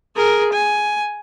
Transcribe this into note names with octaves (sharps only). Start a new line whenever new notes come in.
G#4 A#4
G#5